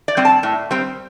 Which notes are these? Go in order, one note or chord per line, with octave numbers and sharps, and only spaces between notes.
D5
G3 C4
A5
A2
G3 C4